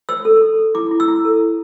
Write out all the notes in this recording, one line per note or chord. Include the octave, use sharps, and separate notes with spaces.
C5 E6
A4
A4
A4
E4 D6
E4
E6
E4
A4
E4